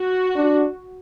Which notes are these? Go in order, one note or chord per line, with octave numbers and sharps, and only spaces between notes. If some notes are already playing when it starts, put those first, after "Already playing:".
Already playing: F#4
D4